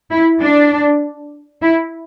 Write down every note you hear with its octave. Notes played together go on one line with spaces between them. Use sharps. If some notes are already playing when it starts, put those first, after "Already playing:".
E4
D4
E4